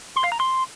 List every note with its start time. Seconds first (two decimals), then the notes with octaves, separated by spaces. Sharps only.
0.16 C6
0.24 F5
0.32 A#5
0.40 C6